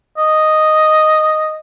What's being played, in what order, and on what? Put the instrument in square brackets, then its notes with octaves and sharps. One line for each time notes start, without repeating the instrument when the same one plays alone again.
[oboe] D#5